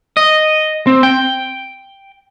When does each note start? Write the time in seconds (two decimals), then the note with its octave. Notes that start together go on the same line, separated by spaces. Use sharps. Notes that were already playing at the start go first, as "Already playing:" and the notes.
0.17 D#5
0.87 C4
1.03 G5